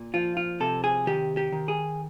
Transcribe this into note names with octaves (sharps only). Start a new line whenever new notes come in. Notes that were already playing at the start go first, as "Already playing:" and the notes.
Already playing: A#2
F3 F4
F4
C3 A4
G#4
D#3 G4
G4
D#3
G#4